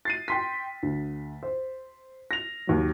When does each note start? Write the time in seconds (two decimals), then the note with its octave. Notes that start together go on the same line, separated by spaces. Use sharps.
0.05 A6 C7 D#7
0.28 G5 C6 B6
0.83 D2
1.43 C5
2.31 A#6 F7
2.67 D#2 F#3